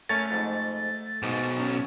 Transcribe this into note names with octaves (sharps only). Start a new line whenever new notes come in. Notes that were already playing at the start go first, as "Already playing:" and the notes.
A3 C#4 A#4 C#5 A6
F2 G#2
B1 G#2 B2
C#4